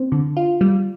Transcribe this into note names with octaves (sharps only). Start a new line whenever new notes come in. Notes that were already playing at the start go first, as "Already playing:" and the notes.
Already playing: C4
D3
F4
G3